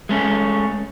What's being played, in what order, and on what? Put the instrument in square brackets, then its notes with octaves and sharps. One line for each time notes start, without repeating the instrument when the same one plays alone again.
[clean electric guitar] G#3 A3 C#4